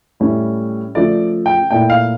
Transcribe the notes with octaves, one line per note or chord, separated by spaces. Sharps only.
A2 G3 C#4 E4
C#3 F3 A3 D5
G5
A#2 A3 E4 G5
F5